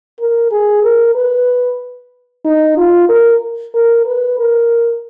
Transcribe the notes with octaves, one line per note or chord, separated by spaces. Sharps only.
A#4
G#4
A#4
B4
D#4
F4
A#4
A#4
B4
A#4